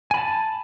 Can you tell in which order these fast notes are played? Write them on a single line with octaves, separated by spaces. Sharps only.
G#5 B5 A5